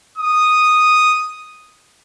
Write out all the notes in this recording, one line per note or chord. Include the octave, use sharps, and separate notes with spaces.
D#6